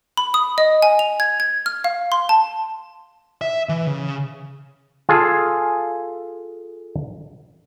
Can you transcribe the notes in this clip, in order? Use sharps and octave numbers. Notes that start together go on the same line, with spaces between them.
B5
D#6
D#5
G#5
F7
G#6
G#6
F6
F5
C6
A5
E5
E3
C#3
F4 G#4 A4